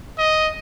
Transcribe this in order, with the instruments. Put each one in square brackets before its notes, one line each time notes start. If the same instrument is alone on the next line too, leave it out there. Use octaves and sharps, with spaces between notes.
[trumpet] D#5